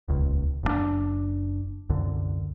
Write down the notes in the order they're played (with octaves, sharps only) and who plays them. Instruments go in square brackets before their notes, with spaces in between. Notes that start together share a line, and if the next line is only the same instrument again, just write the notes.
[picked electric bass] D#1 C#2
F#1 B2 D4
C2 F#2 D3